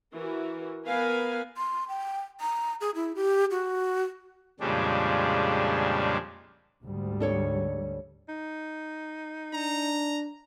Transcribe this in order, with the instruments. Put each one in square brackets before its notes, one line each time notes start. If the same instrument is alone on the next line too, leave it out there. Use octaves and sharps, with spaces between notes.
[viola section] E3 F#4 A#4
B3 A#4 B4 F5 G#5
[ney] C6
G5
A#5
G#4
E4
G4
F#4
[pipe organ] F2 A#2 C#3 G3 G#3 D4
[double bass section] D2 G#2 G3
[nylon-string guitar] D4 A4 C#5
[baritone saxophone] D#4
[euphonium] D4 [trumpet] A#5